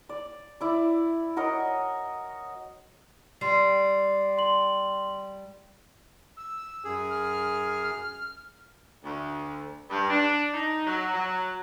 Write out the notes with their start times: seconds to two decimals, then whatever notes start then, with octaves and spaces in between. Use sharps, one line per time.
0.09 D5
0.61 E4 D5
1.36 F#4 A#4 C#5 D#5
3.41 G3 C6 C7
4.37 C6 F#7
6.37 E6
6.84 F#2 G#4
7.10 F6
9.04 D2
9.90 G2
10.10 D4
10.54 D#4
10.87 F#3
11.15 F#3